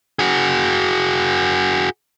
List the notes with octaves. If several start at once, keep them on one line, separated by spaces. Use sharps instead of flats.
F#4 G#4